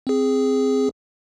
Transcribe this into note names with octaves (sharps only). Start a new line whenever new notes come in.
C4 G#4